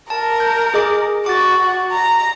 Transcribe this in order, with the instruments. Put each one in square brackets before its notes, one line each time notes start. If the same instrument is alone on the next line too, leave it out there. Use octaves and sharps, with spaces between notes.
[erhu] A#4 [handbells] A5
[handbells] G6
G#4 D#5 D6
[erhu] F#4 [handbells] D6 A6
[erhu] A#5